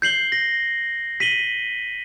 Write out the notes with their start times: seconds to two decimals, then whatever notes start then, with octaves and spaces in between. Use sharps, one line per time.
0.02 G6 C7 F#7 G7
0.32 A#6
1.20 B6 D#7 F#7 G7